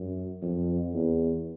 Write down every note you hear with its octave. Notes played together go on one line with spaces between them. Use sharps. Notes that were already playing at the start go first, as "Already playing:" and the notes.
Already playing: F#2
F2
E2